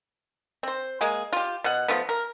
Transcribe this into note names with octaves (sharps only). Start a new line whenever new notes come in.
C4 C5
G#3 A#3 G#4
F4 G4
B2 F#5
F3 A3 B3
A#4